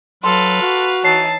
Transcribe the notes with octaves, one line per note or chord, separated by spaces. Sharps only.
F#3 A4 B4 F5 C6
F#4
E3 D#4 C#5 A5 C7